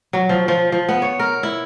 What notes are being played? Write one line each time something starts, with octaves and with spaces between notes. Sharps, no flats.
F#3
F3
F3
F3
B3
C#5
A#4
E4